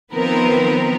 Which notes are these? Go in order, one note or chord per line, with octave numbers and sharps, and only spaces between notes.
D#3 F3 B3 C4 A#4 B4